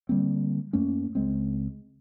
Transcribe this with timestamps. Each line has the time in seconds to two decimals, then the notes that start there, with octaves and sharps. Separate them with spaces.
0.09 D3 G3 A#3 C4
0.73 F#2 A3 A#3 C#4
1.15 C#2 G#3 C4